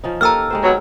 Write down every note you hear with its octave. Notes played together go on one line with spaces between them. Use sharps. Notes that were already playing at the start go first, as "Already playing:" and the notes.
F3 C#4 D#4
A#3 G4 A4 A#5 E6 F6
G#3 G4 C5
B2 F#3